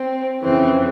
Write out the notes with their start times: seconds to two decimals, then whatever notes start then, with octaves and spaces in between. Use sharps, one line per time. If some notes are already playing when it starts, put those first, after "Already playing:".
Already playing: C4
0.43 F2 C#3 E3 C4